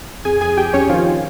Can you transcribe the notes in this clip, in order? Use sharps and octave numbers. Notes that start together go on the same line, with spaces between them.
F2 G#4 G#5
F2 G#4 G#5
F2 G4 G5
F2 C#4 C#5
D#3 F3 F4
D#3